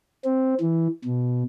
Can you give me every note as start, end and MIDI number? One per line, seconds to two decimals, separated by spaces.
0.25 0.55 60
0.61 0.88 52
1.05 1.43 47